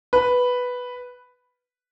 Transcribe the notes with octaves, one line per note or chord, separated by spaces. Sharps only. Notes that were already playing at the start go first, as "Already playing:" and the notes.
B4